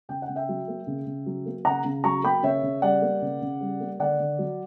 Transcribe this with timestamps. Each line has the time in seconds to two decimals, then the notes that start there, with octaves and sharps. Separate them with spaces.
0.09 C#3 G5
0.22 F#5
0.29 C#3
0.36 E5 G5
0.49 F#3
0.68 A#3
0.87 C#3
1.06 C#3
1.26 F#3
1.46 A#3
1.65 C#3 F#5 A#5
1.85 C#3
2.04 F#3 A#5 C#6
2.23 A#3 G5 B5
2.43 C#3 C#5 E5
2.63 C#3
2.82 G3 D5 F#5
3.02 A#3
3.22 C#3
3.42 C#3
3.61 G3
3.80 A#3
3.99 D3 D5 F#5
4.19 D3
4.39 F#3